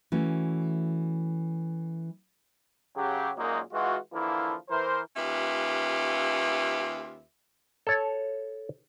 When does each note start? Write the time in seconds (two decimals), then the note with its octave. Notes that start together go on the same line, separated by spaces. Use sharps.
0.12 E3 A3 C#4 F#4
2.96 C#3 F#3 G4
3.37 F#2 A#2 F#3 G#3 A#3 D#4
3.72 E3 G#3 F4 F#4
4.13 D3 E3 F3 A#3 E4
4.70 E3 A#4 C5
5.16 D#2 C#4 F4 G4 B4 E5
7.87 A4 C#5